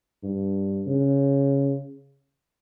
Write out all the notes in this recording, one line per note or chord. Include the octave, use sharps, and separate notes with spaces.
G2
C#3